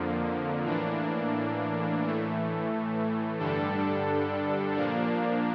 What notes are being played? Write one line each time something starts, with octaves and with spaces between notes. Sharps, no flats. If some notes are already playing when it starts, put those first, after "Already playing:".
Already playing: F2 D3 F3 A#3
A2 E3 A#3 D4
A2 E3 A3
G2 D3 G3 D4 A4
A#2 F3 A#3 D4